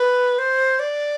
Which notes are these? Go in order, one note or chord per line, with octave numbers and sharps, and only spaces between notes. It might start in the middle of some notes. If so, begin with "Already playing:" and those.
Already playing: B4
C5
D5